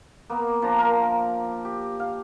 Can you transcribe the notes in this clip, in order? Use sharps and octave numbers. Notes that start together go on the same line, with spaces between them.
A#3 B3
F3 D4 A#5
A#4
G4
F5